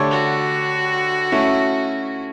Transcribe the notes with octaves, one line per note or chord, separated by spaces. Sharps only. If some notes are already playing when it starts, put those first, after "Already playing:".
Already playing: D3 A3 D4 G4 C#5
F#4
A3 C#4 E4